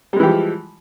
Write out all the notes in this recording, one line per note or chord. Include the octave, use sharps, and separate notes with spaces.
E3 F3 G3 G#3 G4